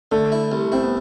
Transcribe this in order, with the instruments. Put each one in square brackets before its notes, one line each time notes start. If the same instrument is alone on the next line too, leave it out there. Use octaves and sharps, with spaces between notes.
[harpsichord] D3 [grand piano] A3
[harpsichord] E4
C2
[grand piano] C4 [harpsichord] E4
[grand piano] B3